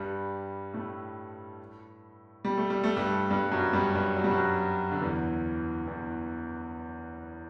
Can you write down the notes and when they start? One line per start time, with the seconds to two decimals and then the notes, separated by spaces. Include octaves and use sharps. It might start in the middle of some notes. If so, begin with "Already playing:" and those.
Already playing: G2 G3
0.74 A2 A3
2.45 G3
2.57 A3
2.70 G3
2.84 A3
2.96 G2 G3
3.31 G2 G3
3.52 F#2 F#3
3.73 G2 G3
3.95 G2 G3
4.17 F#3
4.24 G3
4.31 F#2 F#3
4.92 D3
5.01 E2 E3
5.87 E2 E3